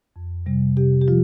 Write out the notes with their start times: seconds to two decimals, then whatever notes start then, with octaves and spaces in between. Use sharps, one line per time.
0.16 F2
0.46 C3 G3
0.76 C3 G4
1.02 G4
1.08 F3 F4